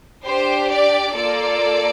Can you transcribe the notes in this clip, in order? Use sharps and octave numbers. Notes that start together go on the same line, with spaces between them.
D4 G4 C5
D5
A#3 F4 A4 D5